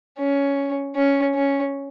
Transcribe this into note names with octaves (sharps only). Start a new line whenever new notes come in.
C#4
C#4
C#4